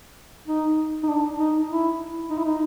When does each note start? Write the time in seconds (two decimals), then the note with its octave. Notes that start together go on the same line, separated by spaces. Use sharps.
0.47 D#4
1.03 D#4
1.08 D4
1.39 D#4
1.70 E4
2.30 D#4
2.38 E4
2.44 D#4